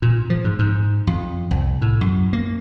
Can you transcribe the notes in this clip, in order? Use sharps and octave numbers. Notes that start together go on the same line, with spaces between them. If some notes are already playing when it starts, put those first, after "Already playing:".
A#2
F3
G#2
G#2
F2
C2
A2
F#2
A#3